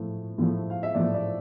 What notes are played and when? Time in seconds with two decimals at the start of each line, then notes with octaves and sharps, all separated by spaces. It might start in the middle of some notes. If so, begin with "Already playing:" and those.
Already playing: A2 F3 A3
0.38 A2 F3 A3
0.70 F5
0.83 E5
0.95 A2 F3 A3 D5
1.14 D5